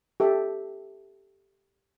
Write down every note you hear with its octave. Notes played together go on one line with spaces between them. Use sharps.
G4 A4 E5